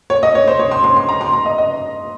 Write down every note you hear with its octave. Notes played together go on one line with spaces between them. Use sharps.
C#5
D#5
C#5
C5
C#5
C6
C6
C6
A#5
C6
A#5
D#5
D#5